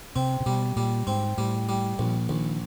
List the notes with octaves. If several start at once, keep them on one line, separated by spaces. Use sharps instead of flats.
C3 C4
C3
B2 G3
A#2 G3
G#2 C4
A2 G3
G3
A#1 A#2
A#1 D#3